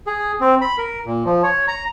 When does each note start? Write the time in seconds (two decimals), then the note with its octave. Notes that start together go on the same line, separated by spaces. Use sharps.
0.07 G#4
0.41 C4
0.61 B5
0.78 A#4
1.06 A#2
1.26 F3
1.43 C#5
1.68 A#5